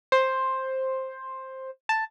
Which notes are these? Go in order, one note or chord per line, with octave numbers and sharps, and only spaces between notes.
C5
A5